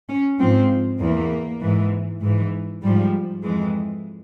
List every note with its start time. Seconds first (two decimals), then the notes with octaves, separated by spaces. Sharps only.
0.09 C#4
0.40 G#2 F3 C4
1.00 E2 E3 A#3
1.61 G#2 E3
2.22 G#2 E3
2.82 G#2 F3 G3
3.43 F2 E3 G#3